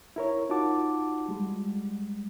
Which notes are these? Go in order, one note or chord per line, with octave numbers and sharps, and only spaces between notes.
E4 A#4 C#5
D#4 F4 F#4 F#5 A5 D6
G3 G#3